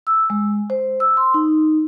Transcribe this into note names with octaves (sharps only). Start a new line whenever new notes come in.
E6
G#3
C5
E6
C6
D#4